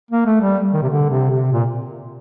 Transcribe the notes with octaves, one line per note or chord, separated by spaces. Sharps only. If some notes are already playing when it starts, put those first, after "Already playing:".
A#3
A3
G3
D#3
C3
D3
C3
C3
A#2